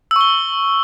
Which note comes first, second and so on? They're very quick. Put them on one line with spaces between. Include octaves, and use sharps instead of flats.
E6 C#6 G7